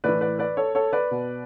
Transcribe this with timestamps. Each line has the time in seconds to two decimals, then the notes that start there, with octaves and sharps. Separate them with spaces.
0.04 A2 E3 B4 D5
0.21 B4 D5
0.39 B4 D5
0.57 A4 C#5
0.75 A4 C#5
0.93 B4 D5
1.11 B2